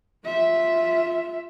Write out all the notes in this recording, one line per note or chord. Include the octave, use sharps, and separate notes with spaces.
F4 E5